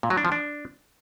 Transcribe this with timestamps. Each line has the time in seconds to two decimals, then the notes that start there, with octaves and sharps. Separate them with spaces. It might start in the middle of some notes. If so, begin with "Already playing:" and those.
0.03 A#2
0.10 F#3
0.17 D4
0.25 F3
0.32 D4